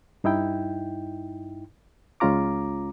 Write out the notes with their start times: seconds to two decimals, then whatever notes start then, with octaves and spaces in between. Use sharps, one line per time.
0.24 G2 D#4 E4 G5
2.20 C#2 G#3 C#4 F4 A#5 D6